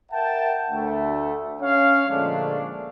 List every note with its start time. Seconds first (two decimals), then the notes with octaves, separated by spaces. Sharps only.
0.12 A#4 E5 F#5 G5 A5
0.71 D2 A3
1.61 C#4 C#5 F5
2.09 A#2 D3 F3 G#3 A3 D4